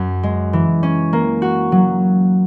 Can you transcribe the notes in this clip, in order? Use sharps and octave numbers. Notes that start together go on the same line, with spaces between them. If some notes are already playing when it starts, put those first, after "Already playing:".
Already playing: F#2 C#4
G#3
E3
C#4
A#3
F#4
F#3